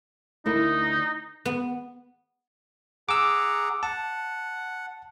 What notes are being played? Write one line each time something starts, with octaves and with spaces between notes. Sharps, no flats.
D2 D#4 E4 A#4
B3
G#4 F#5 A#5 D6 E6
F#5 A5